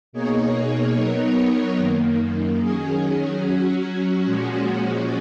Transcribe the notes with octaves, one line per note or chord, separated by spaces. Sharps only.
B2 A#3 D#4 G#4 C#5
F#3 B3 D#4 A#4 C#5
F#2 D#3 A#3
D#3 F#3 C#4 G#4
F#3 C#4 F#4
A#2 F3 G#3 C#4 F#4